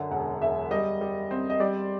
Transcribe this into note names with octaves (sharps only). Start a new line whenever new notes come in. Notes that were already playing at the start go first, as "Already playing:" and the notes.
Already playing: F#2 D3
E1 F#5
E1 E5
G3 D#5
G3
C4
D#5
G3 D5